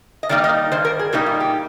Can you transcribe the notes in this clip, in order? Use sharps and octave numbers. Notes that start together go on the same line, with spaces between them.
D#5
D#3 G3 A#3 D#4 D5
D#5
G2 D#3 C5
A#4
G#4
A#2 G3 A#3 D#4 G4
F4
G4